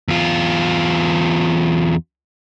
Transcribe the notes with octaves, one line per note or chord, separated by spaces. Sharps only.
E2 F4